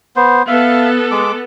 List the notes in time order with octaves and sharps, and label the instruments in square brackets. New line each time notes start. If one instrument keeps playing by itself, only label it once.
[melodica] B3 C5
[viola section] B3 A4 [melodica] E5 F5
[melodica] G#3 D6